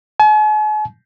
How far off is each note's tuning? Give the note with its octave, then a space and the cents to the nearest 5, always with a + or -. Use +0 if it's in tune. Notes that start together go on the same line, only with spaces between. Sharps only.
G#5 +45